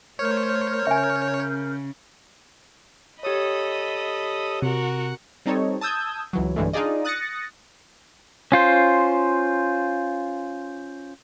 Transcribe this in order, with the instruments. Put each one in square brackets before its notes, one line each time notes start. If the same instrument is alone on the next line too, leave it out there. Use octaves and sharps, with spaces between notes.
[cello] A3 C5 [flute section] A#4 F6 G6 [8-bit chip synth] C#5
[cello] C#3 [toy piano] E5 G#5
[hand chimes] G4 C#5 [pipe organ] A4 D#6 [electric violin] D#5 B5
[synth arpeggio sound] C3 [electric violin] F#4 A#4 [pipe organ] F#5
[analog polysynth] G3 C4 D#4 A4 C#5
A5 D#6 E6 G6 G#6
C#2 E3 F#3
B1 G2 D3 E3 G#3 A3
D4 D#4 F4 G#4 D5 D#5
D#6 F#6 A6 A#6 C#7
[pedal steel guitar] C#4 F4 C5